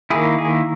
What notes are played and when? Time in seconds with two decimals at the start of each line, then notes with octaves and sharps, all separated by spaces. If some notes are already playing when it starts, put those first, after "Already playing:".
0.10 D#3 A#3 E4 G#4
0.38 G#4